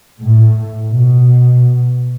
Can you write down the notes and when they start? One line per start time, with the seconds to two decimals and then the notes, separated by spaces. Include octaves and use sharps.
0.21 A2
0.90 B2